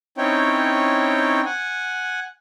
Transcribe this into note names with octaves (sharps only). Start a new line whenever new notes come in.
C4 C#4 D#4 E4 C#5 G5
F#5 G#5